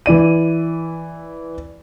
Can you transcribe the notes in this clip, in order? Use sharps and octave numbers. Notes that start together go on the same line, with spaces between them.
E3 E4 D5 D#7